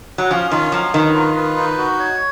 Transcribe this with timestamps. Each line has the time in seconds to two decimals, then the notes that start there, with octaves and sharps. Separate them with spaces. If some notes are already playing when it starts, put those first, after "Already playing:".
0.18 F#3
0.31 F3 C#4
0.51 D#3 F4
0.72 F3 F#3
0.94 D#3 B4
1.14 F4
1.35 B4
1.57 D#4
1.78 F#4
1.99 C#5